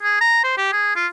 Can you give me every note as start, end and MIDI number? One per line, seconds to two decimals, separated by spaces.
0.03 0.17 68
0.21 0.43 82
0.44 0.53 72
0.57 0.71 67
0.72 0.93 68
0.96 1.07 65